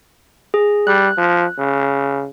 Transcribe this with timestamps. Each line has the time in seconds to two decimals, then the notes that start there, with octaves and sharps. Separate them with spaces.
0.54 G#4
0.87 G3 F#6
1.17 F3
1.58 C#3